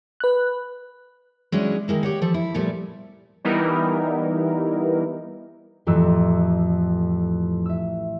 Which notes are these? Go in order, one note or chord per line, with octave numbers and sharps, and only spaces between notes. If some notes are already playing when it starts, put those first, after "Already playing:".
B4 F#6
F#3 G#3 C#4 D4 E4
D#3 F3 G#3 A#3 E4
G4 C#5 F#5
F3 A4
E4
A#2 F3 G3 A3
E3 G3 B3 D#4 E4 A#4
A1 F2 E3 E6
E5 E6